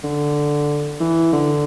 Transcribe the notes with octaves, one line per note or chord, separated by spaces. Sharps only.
D3
E3
D3